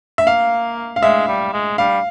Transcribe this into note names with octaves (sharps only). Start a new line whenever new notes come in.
E5
A#3 F5
F5
G#3 E5
G3
G#3
G3 F5